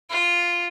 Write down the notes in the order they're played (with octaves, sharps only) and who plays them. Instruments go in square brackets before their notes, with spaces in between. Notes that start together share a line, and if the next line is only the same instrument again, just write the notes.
[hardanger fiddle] F4